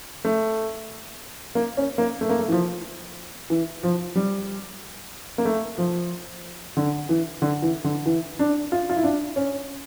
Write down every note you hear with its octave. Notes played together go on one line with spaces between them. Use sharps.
A3
A#3
C#4
A#3
A3
A#3
A3
E3
F3
E3
F3
G3
A#3
A3
F3
D3
E3
D3
E3
D3
E3
D4
F4
F4
E4
D4
C#4